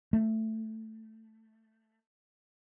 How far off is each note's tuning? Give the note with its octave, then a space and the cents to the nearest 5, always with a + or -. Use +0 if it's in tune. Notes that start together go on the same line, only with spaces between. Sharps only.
A3 +5